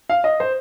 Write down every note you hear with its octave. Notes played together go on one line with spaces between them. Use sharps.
F5
D#5
C5